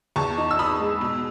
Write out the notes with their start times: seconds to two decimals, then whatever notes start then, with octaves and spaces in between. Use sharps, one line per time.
0.16 E2 A5 C#6
0.38 D#4
0.51 E6
0.59 D#4 B5 D#6
0.80 G#3
1.01 B2